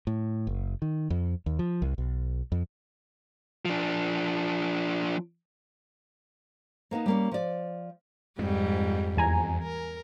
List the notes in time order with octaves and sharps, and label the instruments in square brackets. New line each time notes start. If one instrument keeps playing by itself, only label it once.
[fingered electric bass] A2
F#1
D#3
F2
D#2
F3
C2
B1
F2
[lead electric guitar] F3 D4
[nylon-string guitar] A#3 B3 D4 D#4
G3 A#3 C#4
F3 D5
[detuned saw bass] F2 [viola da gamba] G#2 G3
[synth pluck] E2 G#5 A#5
[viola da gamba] A#4